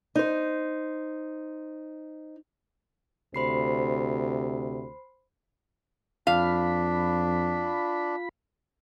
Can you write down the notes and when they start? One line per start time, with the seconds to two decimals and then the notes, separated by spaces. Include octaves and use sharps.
0.15 D#4 C5
3.34 D2 C3 C5 B5 C7
6.27 F2 D4 F4 F5 B5